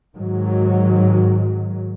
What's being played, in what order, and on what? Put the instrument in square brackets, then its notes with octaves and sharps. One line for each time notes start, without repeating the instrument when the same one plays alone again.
[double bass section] G#2 D#3 F#3